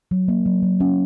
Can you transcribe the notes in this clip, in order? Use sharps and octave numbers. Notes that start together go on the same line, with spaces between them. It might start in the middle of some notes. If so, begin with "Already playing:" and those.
F#3
A#3
F#3
F#3
C#4